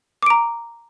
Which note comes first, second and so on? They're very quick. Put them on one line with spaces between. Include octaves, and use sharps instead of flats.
D6 D7 A#5